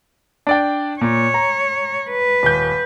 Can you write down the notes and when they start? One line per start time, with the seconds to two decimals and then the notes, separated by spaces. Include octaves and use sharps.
0.47 D4 D5 G5
1.01 A#2 C#5
1.34 A#5
2.10 B4
2.43 D#1 G6